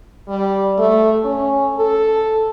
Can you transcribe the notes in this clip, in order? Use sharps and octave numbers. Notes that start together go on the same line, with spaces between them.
G3
A3
C#4
A4